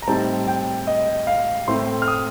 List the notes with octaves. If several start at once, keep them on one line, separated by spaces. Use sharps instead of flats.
A#5
A2 G3 C4 D#4 A5
G5
D#5
F5
A2 A3 C4 C6
F6
D#6